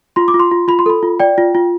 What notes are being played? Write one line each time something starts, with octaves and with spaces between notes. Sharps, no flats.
F4 C6
D6
F4
C6
F4
F4 B5
C6
A4 B5
F4
D5 G5
F4
F4